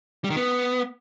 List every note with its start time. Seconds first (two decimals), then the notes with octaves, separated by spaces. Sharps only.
0.24 G3
0.30 D#3
0.36 B3